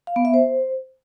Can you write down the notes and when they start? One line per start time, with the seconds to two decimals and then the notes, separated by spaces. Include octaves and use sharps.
0.07 F5
0.16 B3
0.25 E5
0.34 C5